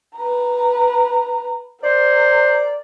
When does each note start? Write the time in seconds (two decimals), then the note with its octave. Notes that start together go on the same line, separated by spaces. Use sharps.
0.17 B4 A#5
1.84 A#4 C5 D5